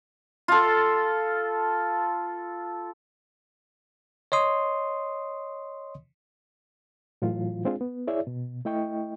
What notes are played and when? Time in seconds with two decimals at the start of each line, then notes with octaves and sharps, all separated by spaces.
0.48 F4 A4
4.32 C#5 D#5 C6 D#6
7.22 A2 E3 F#3 F4
7.65 G#3 C4 D4 F4 G#4
7.81 B3
8.07 E4 G#4 C#5 D5 E5
8.27 B2
8.65 A3 E4 D#5 G5 C#6